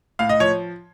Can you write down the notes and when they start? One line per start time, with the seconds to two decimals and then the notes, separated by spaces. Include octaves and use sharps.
0.19 A2 F5
0.29 D#5
0.40 F3 C#5